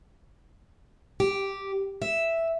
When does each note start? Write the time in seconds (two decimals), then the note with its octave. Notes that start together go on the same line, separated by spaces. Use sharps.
1.20 G4
2.02 E5